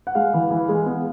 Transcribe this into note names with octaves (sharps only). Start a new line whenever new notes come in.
F#5
G#3 F5
E3
E3
G#3
B3